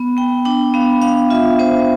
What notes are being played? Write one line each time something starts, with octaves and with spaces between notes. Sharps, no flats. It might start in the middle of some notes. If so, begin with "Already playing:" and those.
Already playing: B3
B3 G5
D4 G5
B3 F5
D4 F5
F4 E5
B3 C5